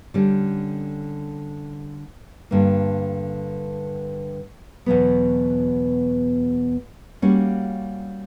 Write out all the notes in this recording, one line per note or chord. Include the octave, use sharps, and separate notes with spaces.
D3 G3 C#4
G2 D3 A#3
E2 B2 F#3 B3
G3 A#3 C#4 F#4